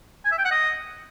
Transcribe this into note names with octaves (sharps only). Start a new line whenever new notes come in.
G#5
E5
G5
F#5
D#5